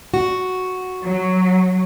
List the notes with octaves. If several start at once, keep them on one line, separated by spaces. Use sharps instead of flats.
F#4
F#3